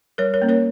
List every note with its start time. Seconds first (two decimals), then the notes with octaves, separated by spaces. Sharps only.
0.18 G3 A#4 C#5
0.34 A#4 C#5
0.42 A#3 C#4
0.49 A#4 C#5